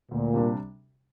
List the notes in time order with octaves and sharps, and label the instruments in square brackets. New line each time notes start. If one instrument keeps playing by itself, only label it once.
[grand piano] D2 [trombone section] A#2
[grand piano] C3 G3 D4